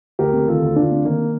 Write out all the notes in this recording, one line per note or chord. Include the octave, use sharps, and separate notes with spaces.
D2 G4 A#4
C3
D#3 F4 A4
D2
D2 D4 F4
C3
D#3 A#3